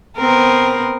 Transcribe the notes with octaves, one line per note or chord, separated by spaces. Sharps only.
B3 C4 A#4